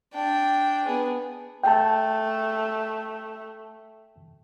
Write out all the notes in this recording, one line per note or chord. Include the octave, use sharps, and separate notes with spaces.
D4 G5
B3 G#4
A3 G5 A5